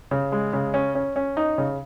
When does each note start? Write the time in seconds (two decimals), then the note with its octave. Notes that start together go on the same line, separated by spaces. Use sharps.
0.11 C#3
0.32 G#3
0.53 C#3
0.74 C#4
0.95 C#4
1.16 C#4
1.37 D#4
1.58 C#3